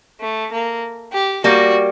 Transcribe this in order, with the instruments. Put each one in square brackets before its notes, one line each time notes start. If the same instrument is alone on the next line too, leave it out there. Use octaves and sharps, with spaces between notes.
[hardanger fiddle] A3
A#3
G4
[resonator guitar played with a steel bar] G3 A#3 [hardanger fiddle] F#4